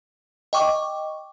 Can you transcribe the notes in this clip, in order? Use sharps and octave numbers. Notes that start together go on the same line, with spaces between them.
D#5 G5 C#6 D6